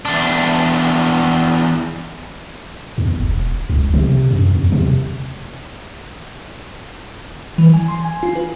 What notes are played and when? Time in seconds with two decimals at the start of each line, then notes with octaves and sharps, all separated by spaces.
0.05 E2 D4
2.98 E2
3.20 E1
3.69 C#2
3.94 C3
4.31 F#2
4.55 E2
4.72 C3
7.58 E3
7.74 G#5
7.88 C6
8.05 G#5
8.23 F4
8.35 B4